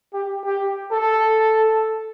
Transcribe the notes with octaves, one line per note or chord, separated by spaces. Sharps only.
G4
G4
A4